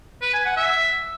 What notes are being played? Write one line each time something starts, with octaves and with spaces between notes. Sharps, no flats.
B4
G#5
F#5
E5